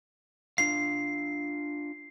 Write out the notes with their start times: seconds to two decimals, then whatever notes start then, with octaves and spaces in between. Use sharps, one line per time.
0.58 D4 F4 F5 C7